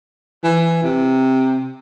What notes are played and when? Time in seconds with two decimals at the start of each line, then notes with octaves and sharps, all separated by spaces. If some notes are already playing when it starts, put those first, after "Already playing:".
0.44 E3
0.83 C3